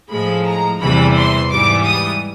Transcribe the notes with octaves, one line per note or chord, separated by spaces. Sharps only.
A2 F3 G#3 B5
A#5
E2 C3 E3 G3 B5
C6
G#2 E3 G3 D6
D#6